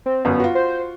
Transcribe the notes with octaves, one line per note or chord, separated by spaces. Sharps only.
C4
G1 F#2 B3
F4 F#4
C5